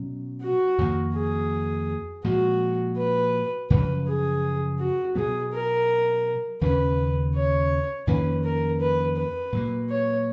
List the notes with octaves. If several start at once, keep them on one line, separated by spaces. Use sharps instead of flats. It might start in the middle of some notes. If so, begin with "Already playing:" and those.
Already playing: B2 F#3 C#4
F#4
F2 D#3 A#3
G#4
A#2 F3 G#3 F#4
B4
F#2 C#3 F3 B4
G#4
F#4
B2 F#3 B3 G#4
A#4
D#2 C#3 G#3 C#4 B4
C#5
F2 D#3 A#3 C#4 B4
A#4
B4
B4
A#2 F#3 A#3
C#5